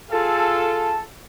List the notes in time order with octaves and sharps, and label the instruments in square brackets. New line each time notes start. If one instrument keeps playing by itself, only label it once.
[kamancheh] F4 G#4 [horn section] A4